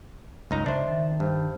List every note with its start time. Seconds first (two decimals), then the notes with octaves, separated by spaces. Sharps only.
0.51 C#2 G2 D#4 A#5
0.66 C#3 D4 C5 E5
0.87 D#3 A5
1.20 G2 C5